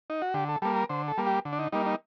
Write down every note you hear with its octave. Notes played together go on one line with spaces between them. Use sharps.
D#4
F#4
D3 G4
A4
G3 A#3 A4
A#4
D3 C5
A4
G3 A#3
G4
D3
D4
D#4
G3 A#3 D#4
D#4